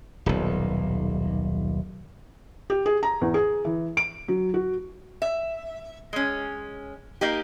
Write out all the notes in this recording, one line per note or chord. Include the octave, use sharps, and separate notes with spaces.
D#1 B1
G4
G#4
A#5
E2
G#4
E3
D7
F#3
F#4
E5
G#3 C#4
A#3 D#4 G4